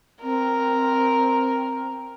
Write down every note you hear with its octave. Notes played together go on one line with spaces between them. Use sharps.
C4 A#4